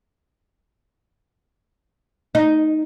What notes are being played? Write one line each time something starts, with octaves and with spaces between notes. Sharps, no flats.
D#4